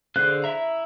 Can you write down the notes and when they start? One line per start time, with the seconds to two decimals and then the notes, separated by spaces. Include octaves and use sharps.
0.16 D3 G#4 C5 F5 F#6
0.44 E4 E5 A#5